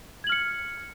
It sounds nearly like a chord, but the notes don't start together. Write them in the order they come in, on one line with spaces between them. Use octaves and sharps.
G#6 F#7 F6 C#7